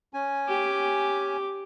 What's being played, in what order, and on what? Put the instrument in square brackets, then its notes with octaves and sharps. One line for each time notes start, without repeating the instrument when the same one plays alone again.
[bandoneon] C#4 G#5
[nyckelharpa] G4 D6